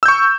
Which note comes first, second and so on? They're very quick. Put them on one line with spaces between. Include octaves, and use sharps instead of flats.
E6 G6 C#6